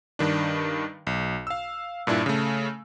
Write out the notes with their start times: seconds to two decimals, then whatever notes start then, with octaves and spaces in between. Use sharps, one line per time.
0.19 G2 D#3 D4
1.07 B1
1.47 F5 E6
2.07 G2 A#2 D4 E4
2.26 C#3 A3